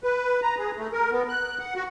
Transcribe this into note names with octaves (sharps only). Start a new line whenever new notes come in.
B4
A#5
G#4
A3
A#4
B3
F#6
F#5
F#4